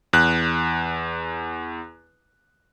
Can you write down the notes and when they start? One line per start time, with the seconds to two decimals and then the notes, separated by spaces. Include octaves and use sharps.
0.13 E2 F#6